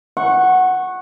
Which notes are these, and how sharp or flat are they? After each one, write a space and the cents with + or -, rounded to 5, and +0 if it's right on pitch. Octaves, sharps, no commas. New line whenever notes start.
F#5 +0 C#6 -20